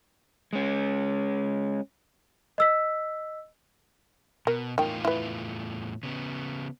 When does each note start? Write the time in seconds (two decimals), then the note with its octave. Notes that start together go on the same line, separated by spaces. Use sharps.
0.53 G#3 C#4
2.58 D#5 E6 B6
4.47 B2 A#4
4.78 E2 A2 D#3 F4 G5
5.05 E4 B4
6.03 C#3 B3